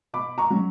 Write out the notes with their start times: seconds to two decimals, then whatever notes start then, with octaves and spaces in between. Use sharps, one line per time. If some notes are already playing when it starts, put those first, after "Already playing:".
0.13 B2 B5 D6
0.38 A#5 C#6
0.50 F#3 C#4